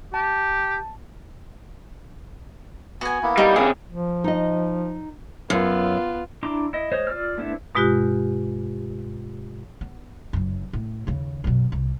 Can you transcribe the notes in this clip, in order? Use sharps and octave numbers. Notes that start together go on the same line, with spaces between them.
G4 A5
B3 F#4 G#5
A#3 B3 E4
G3 D#4
C3 G#4 D#6
F3
D#4 D#5
F#2 B3 F4
D4 E4 A#5 C6 D6
E4 D#5
G#3 C5 C#5 D#5
F4 D5 E6 F6
A3 B3 C4 D4 E4
G2 B2 G#3 F4 G4 F#6
B3
F#1 F#2
A2
D#2 C#3
F#2 B2
C2